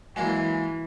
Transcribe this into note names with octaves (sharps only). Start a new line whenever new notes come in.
E3 F#3 G#3 A#3 G#5